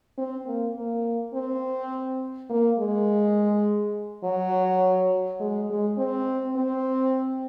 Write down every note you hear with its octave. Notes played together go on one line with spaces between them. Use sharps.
C4
A#3
A#3
C4
A#3
G#3
F#3
G#3
G#3
C4
C4